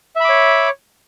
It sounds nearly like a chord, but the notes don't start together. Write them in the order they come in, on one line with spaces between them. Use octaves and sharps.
E5 B5 D6 C#5